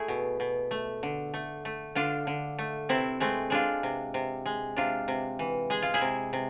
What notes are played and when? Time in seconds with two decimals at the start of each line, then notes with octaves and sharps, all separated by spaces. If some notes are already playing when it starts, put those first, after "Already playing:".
Already playing: A3 E4 G#4
0.08 B2
0.40 B2
0.71 A3
1.03 D3
1.34 A3
1.65 A3
1.95 D3 D4 F4
2.27 D3
2.59 A3
2.89 C3 C4 E4
3.20 G#3 A3 C4
3.50 G#3 D4 F4
3.83 C3
4.14 C3
4.46 G#3
4.76 C3 D4 F4
5.08 C3
5.39 E3
5.70 G#3 G#4
5.82 F4
5.94 E4 G#4
6.01 C3
6.33 C3